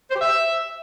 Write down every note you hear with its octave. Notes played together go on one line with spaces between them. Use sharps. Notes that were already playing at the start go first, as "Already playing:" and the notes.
C5
G4
E5